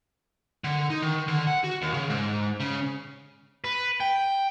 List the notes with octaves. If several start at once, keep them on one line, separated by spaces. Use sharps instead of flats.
D3
D#4
D#3
D3
F#5
F#4
D#2
C#3
G#2
C#3
B4
G5